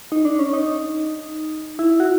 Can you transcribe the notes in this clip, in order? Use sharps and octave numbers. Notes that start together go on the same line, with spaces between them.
D#4
D4
C#4
D#4
E4
F#4